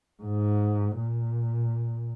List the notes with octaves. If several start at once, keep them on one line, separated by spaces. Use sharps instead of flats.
G#2
A#2